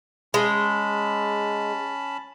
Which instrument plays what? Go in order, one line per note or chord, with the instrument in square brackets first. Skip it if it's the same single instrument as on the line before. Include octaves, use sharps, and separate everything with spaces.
[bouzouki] G#3 [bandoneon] C#4 A5 B5